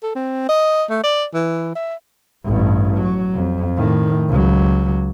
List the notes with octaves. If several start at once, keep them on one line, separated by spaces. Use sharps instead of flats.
A4
C4
D#5
A3
D5
E3
E5
A1 G2
F#3
F2
A2 D#3
C#2 F#3